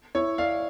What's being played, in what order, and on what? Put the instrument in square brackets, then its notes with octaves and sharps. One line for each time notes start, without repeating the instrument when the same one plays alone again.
[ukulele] E4 [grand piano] C#5
[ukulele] D5 [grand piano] F5